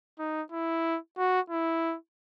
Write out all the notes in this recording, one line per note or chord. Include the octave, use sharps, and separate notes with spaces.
D#4
E4
F#4
E4